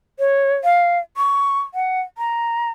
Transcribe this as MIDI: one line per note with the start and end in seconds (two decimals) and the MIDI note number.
0.19 0.54 73
0.64 0.99 77
1.17 1.60 85
1.74 2.01 78
2.18 2.70 82